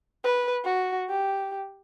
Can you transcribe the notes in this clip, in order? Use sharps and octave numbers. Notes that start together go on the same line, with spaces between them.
B4
F#4
G4